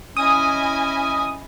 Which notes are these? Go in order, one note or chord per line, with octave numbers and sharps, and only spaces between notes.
C#4 E4 D#5 G#5 D#6